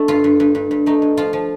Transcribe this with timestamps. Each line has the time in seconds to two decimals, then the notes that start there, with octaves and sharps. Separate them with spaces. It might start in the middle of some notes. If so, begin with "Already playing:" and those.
Already playing: A3 D4
0.08 G2 F4
0.24 G2
0.40 G2
0.55 G2
0.71 G2
0.86 A3 D#4
1.02 G2
1.17 F3 F4
1.33 F3